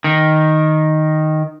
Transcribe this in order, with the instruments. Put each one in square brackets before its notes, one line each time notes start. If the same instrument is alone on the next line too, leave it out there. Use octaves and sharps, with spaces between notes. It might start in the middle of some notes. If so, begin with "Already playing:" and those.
[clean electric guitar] D#3